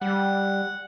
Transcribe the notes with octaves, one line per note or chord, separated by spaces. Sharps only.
G3 F#5